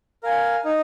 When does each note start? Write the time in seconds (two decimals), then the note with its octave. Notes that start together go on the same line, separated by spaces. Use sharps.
0.23 A#4 F5 G#5
0.65 D#4